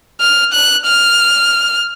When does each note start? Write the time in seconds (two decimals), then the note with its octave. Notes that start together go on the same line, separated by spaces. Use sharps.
0.20 F6
0.53 F#6
0.86 F6